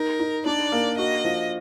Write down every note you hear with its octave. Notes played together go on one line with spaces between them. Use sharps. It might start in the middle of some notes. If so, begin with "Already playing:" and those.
Already playing: D#4 A#4
D#4
D4 D5
A#3
F#4 D#5
F3